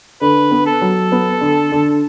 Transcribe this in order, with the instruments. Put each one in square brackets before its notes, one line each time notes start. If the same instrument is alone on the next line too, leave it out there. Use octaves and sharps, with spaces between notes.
[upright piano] D3 [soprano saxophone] B4
[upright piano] B3
[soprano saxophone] A4
[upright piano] F#3
B3
D3
D3